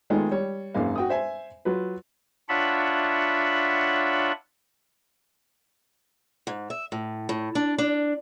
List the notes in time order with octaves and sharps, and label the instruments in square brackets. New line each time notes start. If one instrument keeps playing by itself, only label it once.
[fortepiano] D#3 G#3 A3 B3 D#4 F4
G3 C#5
G#1 F#2 A#3 F5
F#4 G5 D#6
C5 E5 G#5
F#3 F4 B4
[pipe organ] D4 F4 C#5 E5 F#5 B5
[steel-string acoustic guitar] G#2
E5
A2
A2
D4
D4